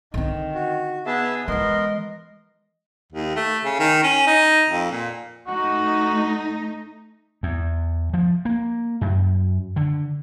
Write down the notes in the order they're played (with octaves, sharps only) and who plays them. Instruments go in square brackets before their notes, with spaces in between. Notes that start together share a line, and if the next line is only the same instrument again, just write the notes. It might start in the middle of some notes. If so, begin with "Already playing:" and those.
[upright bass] D3 C4 [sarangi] D#3
[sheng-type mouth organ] F#4
[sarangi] B3 [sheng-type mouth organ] G#4 E5 A5
[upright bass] E3 G#3 [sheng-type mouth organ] B3 A#4 C6 [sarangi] D#5
[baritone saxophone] D#2
A3
C#3
D#3
C#4
D#4
F2
A#2
[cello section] A3 D#4 [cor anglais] F#4
[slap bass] E2
F3
A#3
F#2
D3